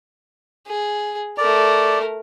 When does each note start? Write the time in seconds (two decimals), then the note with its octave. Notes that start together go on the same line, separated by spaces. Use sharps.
0.67 G#4
1.38 A3 A#4 D5